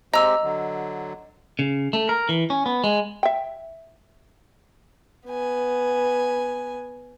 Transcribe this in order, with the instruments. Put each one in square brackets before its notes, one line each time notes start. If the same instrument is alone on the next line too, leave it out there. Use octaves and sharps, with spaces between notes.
[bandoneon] G#3 C4 G4 [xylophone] D#5 E6 [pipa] A#5
[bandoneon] D3 F#3
[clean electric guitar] C#3
A3
A#4
E3
C#4
B3
G#3
[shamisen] E5 G5
[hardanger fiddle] B3 G#5